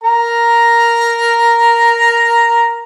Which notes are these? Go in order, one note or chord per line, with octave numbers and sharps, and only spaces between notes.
A#4 A#5